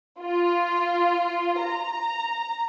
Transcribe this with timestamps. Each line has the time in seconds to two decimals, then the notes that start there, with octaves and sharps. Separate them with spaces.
0.20 F4
1.62 A#5